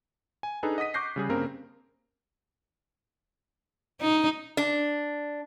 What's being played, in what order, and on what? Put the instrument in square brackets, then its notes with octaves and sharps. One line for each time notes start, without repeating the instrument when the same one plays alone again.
[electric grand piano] G#5
D4 D#4 G#4 A4 B4
D#5 F#5 D#6 B6 D#7
C#6 D6 F#6 G6 A#6 C7
C#3 G3 G#4
G2 C#3 A#3 C4 A#4
[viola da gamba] D#4
[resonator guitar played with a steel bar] D4